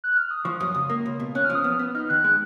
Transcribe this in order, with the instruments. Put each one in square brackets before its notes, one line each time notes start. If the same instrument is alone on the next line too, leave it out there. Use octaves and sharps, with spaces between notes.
[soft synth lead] F#6
F6
D#6
[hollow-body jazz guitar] F3 [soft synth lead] C#6
[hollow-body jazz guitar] F#2 [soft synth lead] D#6
[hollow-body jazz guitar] C#2
A#3
C#2
B2
[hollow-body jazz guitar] C#4 [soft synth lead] F#6
[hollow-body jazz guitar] F3 [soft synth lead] F6
[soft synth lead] D#6
[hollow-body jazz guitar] B3 [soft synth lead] F6
[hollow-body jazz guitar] B3
[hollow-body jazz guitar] D#4 [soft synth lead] F6
[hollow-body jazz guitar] D#3 [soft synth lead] F#6
[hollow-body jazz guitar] G#3